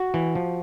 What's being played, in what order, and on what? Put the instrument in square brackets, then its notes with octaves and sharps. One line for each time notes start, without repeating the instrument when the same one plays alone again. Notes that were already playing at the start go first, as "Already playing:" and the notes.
Already playing: [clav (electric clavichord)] F#4
E3
F3